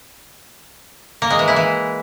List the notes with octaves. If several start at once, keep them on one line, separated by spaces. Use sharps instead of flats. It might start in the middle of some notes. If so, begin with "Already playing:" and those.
A#3
G#3
E3
E4
E3